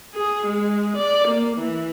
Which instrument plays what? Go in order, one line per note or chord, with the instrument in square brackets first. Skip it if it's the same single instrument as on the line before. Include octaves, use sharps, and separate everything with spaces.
[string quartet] G#4
G#3
D5
A#3
E3